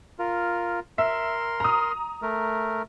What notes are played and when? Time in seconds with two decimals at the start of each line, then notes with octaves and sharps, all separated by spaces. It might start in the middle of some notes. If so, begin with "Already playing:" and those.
0.19 F4 A#4
0.98 A#4 E5 C6
1.60 A#5 D#6
2.22 A3 A#4